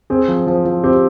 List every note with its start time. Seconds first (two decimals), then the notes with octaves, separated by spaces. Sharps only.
0.10 C4 G#4
0.28 F3
0.47 F3
0.65 F3
0.84 C4 G4